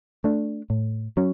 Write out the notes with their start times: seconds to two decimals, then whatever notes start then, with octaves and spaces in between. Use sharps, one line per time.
0.24 A3 D4
0.70 A2
1.17 F#3 C#4